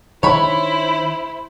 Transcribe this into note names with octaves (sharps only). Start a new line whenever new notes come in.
D#3 D4 E4 C5 C#5 B5